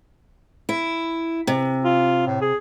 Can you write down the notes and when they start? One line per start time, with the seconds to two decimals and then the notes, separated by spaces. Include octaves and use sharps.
0.69 E4
1.47 C3
1.84 F4
2.27 A2
2.41 G#4